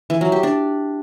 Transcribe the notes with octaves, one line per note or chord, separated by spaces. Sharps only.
E3
F#3
G4
D4